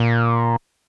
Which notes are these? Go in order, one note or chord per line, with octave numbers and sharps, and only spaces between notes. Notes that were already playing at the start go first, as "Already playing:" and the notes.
Already playing: A#2